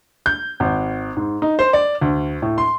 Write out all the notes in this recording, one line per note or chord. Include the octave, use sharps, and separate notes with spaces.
G6
G#1
G#2
D#4
C5
D5
D2
A2
C6